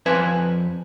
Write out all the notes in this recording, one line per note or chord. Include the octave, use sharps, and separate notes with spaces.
F2 B4 C5 G#5